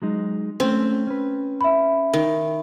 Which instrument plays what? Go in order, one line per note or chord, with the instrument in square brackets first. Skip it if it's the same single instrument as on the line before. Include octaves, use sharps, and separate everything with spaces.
[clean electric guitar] F#3 G#3 D#4
[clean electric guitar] A3 C#4 [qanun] C4
[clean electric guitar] C#4 B4
[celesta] E5 B5
[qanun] D#3